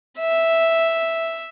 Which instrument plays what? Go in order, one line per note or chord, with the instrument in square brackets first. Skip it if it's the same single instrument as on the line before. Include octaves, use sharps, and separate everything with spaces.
[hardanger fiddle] E5